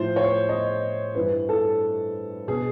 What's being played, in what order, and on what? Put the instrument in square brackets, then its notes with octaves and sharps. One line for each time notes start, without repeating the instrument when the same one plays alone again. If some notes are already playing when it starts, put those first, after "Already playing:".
Already playing: [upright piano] A2 F3 C5
C#5
D#5
G2 E3 B4
A4
B2 G#4